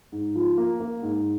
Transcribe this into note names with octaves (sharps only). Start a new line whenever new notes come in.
G#2
F3
A#3
A#3
G#2